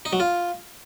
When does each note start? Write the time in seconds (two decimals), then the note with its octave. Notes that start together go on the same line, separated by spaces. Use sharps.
0.05 D#4
0.13 F#3
0.20 F4